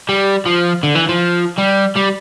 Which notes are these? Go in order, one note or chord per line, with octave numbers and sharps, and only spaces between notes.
G3
F3
D3
E3
F3
G3
G3